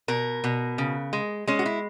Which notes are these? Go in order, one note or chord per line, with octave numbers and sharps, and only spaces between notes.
B2 A#4
B2
C#3
G#3
G#3 C#4
F#4
E4